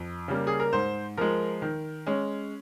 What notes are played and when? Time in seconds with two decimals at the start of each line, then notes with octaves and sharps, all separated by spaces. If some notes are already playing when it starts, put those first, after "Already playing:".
Already playing: F2
0.28 C#3 G3 A#3
0.47 G#4
0.60 A#4
0.73 G#2 C5
1.17 F3 G#3 A#4
1.62 D#3
2.07 G#3 C#4